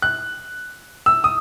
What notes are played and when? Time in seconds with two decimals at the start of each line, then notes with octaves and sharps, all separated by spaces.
0.02 F#6
1.06 E6
1.24 D#6